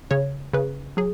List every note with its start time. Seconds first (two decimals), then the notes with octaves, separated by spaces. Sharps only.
0.11 C#3 C#5
0.53 C#3 B4
0.97 F#3 G#4